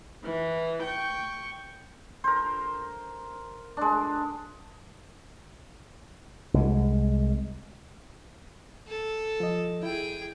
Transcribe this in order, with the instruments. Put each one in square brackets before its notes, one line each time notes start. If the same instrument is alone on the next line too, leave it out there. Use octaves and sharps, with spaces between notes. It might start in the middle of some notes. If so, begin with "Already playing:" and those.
[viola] E3
G5 C#6
[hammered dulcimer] A#4 C5
G#3 D4
[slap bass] C2 G#3
[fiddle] A4
[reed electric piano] F3 D#5
[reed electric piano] E4 [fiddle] G#4 G5